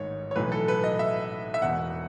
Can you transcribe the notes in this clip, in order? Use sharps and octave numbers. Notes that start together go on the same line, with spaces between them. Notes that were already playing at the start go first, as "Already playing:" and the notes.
Already playing: A1 G#2 D#3 C#5
C#5
B1 A2 E3 B4
A4
B4
D#5
E5
E5
E1 E2 B2 F#5